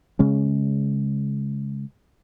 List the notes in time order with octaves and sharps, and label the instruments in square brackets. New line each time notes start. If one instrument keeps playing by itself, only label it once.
[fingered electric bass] C#3 G#3 C#4